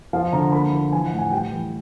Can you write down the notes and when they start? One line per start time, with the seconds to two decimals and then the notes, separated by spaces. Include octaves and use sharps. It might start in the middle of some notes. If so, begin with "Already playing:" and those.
0.13 F3 F5
0.32 D3 A#5
0.52 A#3 B5
0.72 F3
0.92 E3 G#5
1.06 F#5
1.13 A2
1.18 G#5
1.31 G3 G5
1.52 E3